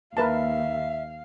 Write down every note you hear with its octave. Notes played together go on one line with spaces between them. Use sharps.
D#2 A#4 B4 E5 F5 A5